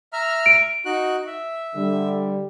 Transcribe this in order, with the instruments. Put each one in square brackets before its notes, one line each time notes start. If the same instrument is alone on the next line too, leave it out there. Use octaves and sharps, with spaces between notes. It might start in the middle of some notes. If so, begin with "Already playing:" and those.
[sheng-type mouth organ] E5 A#5 F6
[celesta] D7
[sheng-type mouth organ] D#4 F#4 F#6
E5
[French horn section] D3 G3